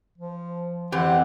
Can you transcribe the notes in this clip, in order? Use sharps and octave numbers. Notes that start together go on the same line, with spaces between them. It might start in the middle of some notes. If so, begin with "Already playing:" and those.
F3
F2 E3 C4 G4 F#5